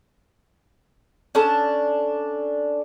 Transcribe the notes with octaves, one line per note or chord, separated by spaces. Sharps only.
C#4 D4 A4 A5